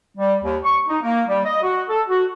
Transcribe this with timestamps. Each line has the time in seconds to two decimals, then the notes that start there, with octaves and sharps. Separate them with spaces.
0.17 G3
0.43 D#2
0.63 C#6
0.88 D#4
1.02 A#3
1.28 G3
1.45 D#5
1.62 F#4
1.89 A4
2.08 F#4